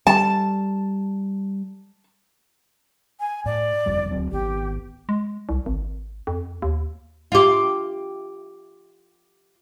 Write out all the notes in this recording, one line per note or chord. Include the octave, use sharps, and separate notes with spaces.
G3 A5
G#5
A2 D5
F#1 F2 G3
D1 F#3 C4
G#1 B3 G4
G#3
C2
G#1
F2
D#2
F4 G4